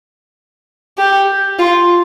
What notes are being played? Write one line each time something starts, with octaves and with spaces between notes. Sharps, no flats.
G4
F4